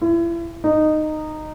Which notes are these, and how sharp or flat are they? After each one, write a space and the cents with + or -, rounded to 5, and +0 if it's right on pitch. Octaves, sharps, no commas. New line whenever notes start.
E4 +35
D#4 -15